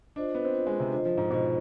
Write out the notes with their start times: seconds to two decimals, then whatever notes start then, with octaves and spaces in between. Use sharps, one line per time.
0.16 D4 F4 C5 D#5
0.35 B3
0.45 C4
0.54 F4 C5 D#5
0.67 G#3
0.80 C3
0.92 D3 F4 C5 D#5
1.05 F3
1.17 G#2
1.31 B2 F4 C5 D#5